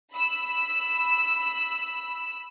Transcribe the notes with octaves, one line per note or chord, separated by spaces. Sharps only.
B5 E6